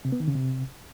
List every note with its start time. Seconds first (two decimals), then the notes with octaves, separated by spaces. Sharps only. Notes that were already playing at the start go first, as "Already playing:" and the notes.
0.05 C3
0.12 B3
0.20 D#3
0.28 C#3
0.35 C3